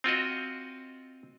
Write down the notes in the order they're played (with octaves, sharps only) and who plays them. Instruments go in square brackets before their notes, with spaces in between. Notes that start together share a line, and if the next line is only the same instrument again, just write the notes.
[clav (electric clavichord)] C4 F4 F#4 D#5